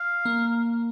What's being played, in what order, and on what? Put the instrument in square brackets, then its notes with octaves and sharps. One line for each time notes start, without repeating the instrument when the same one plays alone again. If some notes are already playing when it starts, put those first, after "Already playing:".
Already playing: [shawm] F5
[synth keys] A#3